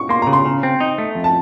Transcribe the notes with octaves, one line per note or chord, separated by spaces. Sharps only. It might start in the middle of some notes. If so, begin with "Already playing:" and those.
Already playing: C#6
A#3 C6
A#5
C#3
C6
C#3
C4
D#4
A3
F2
A5